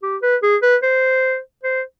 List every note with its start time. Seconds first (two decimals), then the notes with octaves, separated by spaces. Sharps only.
0.03 G4
0.22 B4
0.43 G#4
0.62 B4
0.83 C5
1.63 C5